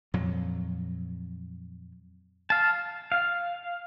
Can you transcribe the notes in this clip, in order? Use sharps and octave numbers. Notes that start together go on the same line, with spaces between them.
F2 A#2 F#3
F5 A5
F5